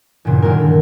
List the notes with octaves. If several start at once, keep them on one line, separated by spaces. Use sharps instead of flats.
E2 G2 A#2 C#3
D3 D#3 F#3 G#3 A#3 A#4
A4